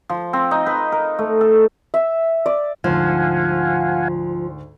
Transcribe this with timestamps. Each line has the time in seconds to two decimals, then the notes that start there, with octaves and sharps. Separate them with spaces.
0.09 F3
0.33 C4
0.51 D#4
0.66 B4
0.92 A#4
1.19 A3
1.41 A4
1.94 E5
2.46 D5
2.84 D2 G#2 F3 F5 F#5 G#5